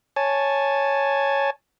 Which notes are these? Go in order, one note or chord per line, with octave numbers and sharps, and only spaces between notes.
C#5 G#5 A5